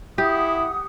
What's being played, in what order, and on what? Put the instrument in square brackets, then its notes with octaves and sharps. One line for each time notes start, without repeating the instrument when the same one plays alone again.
[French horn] E4 [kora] G4 [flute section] F#5 D#6